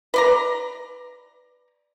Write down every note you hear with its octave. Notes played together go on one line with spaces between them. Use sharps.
B4 D5 A#5